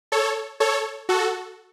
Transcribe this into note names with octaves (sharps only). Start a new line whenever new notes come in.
A4 C#5
A4 C#5
F#4 A4